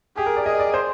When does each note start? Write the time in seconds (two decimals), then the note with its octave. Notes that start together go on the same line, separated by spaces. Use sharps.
0.17 G4 G#4
0.26 A#4
0.37 D5
0.46 G#4 D#5
0.60 D5
0.74 C5